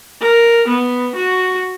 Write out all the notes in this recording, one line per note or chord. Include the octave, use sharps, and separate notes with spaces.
A#4
B3
F#4